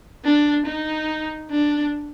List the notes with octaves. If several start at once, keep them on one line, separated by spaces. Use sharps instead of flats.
D4
D#4
D4